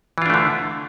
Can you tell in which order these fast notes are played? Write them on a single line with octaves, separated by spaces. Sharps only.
E3 F4 D4 A3 D3